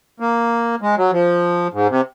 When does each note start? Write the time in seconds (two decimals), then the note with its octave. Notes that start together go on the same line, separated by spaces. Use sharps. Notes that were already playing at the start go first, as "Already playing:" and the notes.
0.20 A#3
0.81 G#3
0.97 F#3
1.12 F3
1.74 G#2
1.89 C3